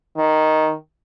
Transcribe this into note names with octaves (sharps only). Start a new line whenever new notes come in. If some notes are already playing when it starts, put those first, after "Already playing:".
D#3